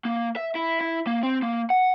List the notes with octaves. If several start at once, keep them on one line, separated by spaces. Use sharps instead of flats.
A#3
E5
E4
E4
A#3
C4
A#3
F#5